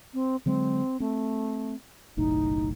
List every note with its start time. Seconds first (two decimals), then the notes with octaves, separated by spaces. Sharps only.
0.14 C4
0.46 D3 F#3 G#3 C4
1.00 A3 C4
2.17 F#1 B1 A2 D#4